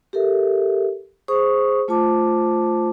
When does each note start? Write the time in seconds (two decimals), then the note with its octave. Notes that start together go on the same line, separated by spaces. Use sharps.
0.13 G4 A4 A#4 E5
1.28 G#4 C5 C#6 D#6
1.88 A3 F4 C5 A5 D6